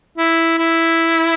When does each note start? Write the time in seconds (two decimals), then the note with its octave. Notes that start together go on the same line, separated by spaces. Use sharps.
0.17 E4
0.58 E4